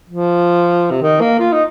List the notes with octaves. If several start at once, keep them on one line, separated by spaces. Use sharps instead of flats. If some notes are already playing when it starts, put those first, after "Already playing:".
F3
C3
D#3
A#3
F4
D#4